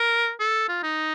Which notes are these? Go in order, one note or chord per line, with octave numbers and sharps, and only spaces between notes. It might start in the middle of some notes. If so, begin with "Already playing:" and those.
Already playing: A#4
A4
F4
D#4